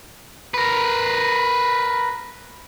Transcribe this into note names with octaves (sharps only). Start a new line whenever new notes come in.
A#4 B4